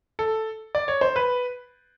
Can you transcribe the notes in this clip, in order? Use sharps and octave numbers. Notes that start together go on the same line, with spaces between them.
A4
D5
C#5
C5
B4